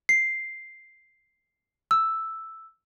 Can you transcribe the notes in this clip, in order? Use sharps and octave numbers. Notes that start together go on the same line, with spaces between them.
C7
E6